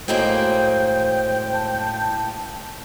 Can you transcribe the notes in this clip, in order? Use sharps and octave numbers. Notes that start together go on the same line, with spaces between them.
A2 F#3 G#3 A#3 C5 G5
A5